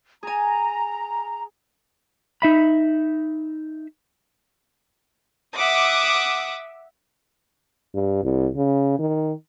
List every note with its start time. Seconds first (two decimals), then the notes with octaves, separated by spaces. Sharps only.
0.23 G#4 G#5 A#5
2.42 D#4 E5 B5
5.55 E5 F#5 D6 D#6
7.94 G2
8.24 C2
8.56 C#3
8.99 D#3